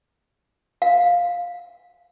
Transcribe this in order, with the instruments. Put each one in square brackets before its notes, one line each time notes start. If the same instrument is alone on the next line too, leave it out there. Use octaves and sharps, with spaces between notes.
[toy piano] F5